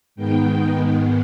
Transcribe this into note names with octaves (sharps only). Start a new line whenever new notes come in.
G#2 D#3 G#3 B3 G5